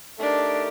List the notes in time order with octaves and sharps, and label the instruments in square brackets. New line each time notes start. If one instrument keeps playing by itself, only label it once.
[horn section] A3 D#4 G4 A#4 [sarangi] D4